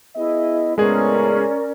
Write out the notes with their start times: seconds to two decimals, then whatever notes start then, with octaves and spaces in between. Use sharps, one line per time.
0.16 B3 E4 G#4 D#5
0.78 A2 C#3 G#3 B3 C#4 G#4 A#4 D5